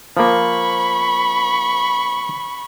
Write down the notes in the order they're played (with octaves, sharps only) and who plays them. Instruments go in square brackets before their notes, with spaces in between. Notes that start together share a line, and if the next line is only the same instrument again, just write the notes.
[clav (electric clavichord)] F3 A#3 [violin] B5 C#6